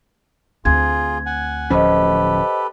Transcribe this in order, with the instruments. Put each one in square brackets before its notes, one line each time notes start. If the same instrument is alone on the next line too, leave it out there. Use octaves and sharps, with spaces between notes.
[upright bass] D2 C4 [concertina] F4 G#4 [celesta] G#6
[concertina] F#5 G#5
[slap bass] D1 F3 C#4 [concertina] G4 A4 B4 [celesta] C5 D#5